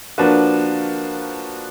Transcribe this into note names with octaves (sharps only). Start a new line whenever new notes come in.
F3 A#3 D4 F#4 B4